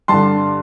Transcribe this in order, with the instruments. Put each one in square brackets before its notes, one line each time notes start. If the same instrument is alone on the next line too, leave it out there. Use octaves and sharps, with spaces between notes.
[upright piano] G2 D3 A5 C6